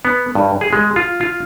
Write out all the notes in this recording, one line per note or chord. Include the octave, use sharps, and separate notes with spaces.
B3
G2
G#4
G#3
F4
F4